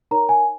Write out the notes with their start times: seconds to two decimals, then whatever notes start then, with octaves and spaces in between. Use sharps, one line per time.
0.11 D#4 A#4 C#5 A#5
0.29 G#5